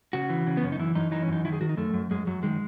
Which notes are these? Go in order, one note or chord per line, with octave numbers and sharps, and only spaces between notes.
C#3 F#4
E3
C#3
B3
F#2 C#4
D#4
E3 E4
F#2 D#4
E3 D#4
C#4
F#2 D#4
D#3 E4
G#4
D#3 F#4
D#4
F#2 A3
F#2
F#2 G#3
F#2 F#3
D#3 G#3